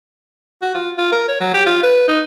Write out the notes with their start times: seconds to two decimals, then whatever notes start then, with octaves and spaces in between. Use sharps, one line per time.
0.62 F#4
0.74 F4
0.98 F4
1.12 A#4
1.28 C#5
1.41 F#3
1.54 G4
1.66 F4
1.83 B4
2.08 D#4